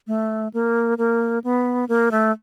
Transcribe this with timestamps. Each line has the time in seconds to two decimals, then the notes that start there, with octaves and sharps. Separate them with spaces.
0.07 A3
0.54 A#3
0.98 A#3
1.44 B3
1.89 A#3
2.11 A3